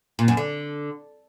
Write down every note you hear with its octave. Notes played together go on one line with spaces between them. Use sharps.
A#2
F#2
D3